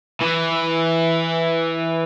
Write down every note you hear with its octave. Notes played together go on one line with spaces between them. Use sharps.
E3